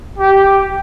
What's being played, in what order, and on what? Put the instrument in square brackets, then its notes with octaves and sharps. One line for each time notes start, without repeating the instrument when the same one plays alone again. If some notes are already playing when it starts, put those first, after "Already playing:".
[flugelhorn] G4